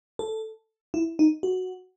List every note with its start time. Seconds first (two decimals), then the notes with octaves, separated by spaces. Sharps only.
0.19 A4
0.94 E4
1.19 D#4
1.43 F#4